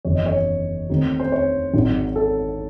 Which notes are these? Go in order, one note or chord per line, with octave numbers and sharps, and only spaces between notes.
F#1 E2 D#3 F#3 C#5
D#5
C#5
D#2 D#3 A3 C4 D#4
C5
C#5
G#1 G#2 D#3 F#3
A4